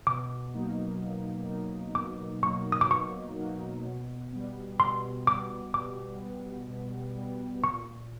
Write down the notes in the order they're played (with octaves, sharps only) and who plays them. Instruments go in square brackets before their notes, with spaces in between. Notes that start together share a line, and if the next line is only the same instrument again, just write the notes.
[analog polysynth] B2 [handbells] D6
[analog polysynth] F#3 A#3 D#4
B2
F#3 A#3 D#4
[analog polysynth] B2 [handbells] D6
[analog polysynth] F#3 A#3 D#4 [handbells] C#6
[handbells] D#6
D6
[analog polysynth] B2 [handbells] C#6
[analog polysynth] F#3 A#3 D#4
B2
G3 B3
[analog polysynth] B2 [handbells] C6
[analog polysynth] G3 B3 [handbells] D6
[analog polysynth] B2 [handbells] D6
[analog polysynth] G3 B3
B2
G3 B3
[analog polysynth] A#2 [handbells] C#6